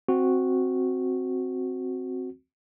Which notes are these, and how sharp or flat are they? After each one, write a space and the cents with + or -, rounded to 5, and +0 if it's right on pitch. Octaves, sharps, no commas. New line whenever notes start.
C4 +0 F#4 -5